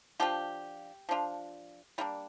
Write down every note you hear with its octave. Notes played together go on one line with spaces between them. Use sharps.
F3 D4 F4 G4
F3 D4 F4
G3 A#3 D4 F4